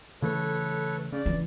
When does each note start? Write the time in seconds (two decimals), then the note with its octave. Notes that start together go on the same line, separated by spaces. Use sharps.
0.22 C#3 E3 A3 A4 B4 C#5
1.13 C#3 D5
1.26 C#2 E3 A3